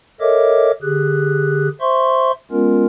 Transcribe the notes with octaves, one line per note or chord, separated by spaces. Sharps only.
A4 A#4 C#5 D#5 E5 D6
D3 G4 G#4 F#6
C5 E5 C6 C#6
G#3 B3 C#4 F4 A#4